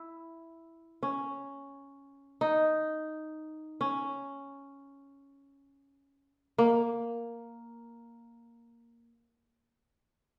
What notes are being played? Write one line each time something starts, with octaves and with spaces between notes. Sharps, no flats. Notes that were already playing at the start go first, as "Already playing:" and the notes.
Already playing: E4
C#4
D#4
C#4
A#3